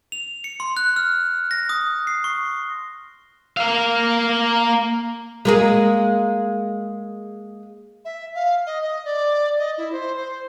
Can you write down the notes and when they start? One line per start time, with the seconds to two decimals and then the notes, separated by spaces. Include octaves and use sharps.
0.12 F7
0.44 C#7
0.60 C6
0.77 F#6
0.96 F6
1.51 A#6
1.69 D#6
2.07 C7
2.24 C#6
3.57 A#3 F5
5.45 G#3 A#3 G#4
8.05 E5
8.35 F5
8.67 D#5
8.82 D#5
9.05 D5
9.59 D#5
9.78 E4
9.92 C5
10.16 C5